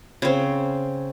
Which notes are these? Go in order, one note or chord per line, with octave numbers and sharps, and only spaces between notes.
C#3 C4